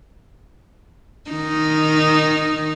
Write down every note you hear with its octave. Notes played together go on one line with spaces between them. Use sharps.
D#3 D#4